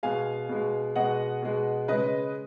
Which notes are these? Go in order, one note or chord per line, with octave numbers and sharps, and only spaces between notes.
B2 G#3 F5 G#5
B2 G#3
B2 G#3 D#5 F#5
B2 G#3
C#3 G#3 B4 D#5